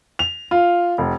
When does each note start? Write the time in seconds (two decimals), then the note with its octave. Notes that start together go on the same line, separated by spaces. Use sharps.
0.19 F7
0.51 F4
0.98 F1